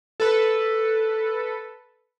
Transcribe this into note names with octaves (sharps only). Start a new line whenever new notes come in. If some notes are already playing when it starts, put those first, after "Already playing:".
A4 B4